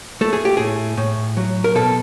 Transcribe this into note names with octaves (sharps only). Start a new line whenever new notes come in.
A3 A4
G#4
G4
A2 G#4
A2
F#3
A#4
B2 A4